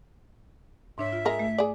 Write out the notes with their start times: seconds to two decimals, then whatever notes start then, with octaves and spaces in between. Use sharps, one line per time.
0.98 G#2 D4 C#5 E5
1.13 F4
1.25 G#3 A#4 D#5
1.39 A3
1.58 G#4 D5